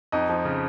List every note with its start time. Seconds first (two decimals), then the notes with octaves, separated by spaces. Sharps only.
0.12 F2 D#4 D#5
0.29 F3
0.45 C#3